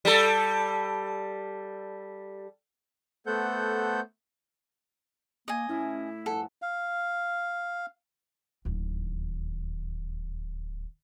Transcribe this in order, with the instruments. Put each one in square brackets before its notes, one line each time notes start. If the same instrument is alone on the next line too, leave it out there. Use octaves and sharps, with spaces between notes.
[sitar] G3 A4
[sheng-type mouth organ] A3 B3 A4 C5 F#5 G6
[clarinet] A#3 [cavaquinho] D#5 G#5
[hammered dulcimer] A2 [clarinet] C#4 [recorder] E4
[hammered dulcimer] G2 F3 G#5 [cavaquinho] A4 [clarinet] F#5
[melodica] F5
[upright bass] D1 D#2